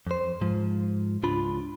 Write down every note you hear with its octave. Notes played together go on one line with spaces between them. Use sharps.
F2 C5
G#2 F3
C#2 D4 F4 B5